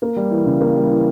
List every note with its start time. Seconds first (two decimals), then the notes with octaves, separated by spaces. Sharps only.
0.02 A#3
0.16 G3
0.31 E3
0.46 C#3
0.61 A#3
0.76 G3
0.91 E3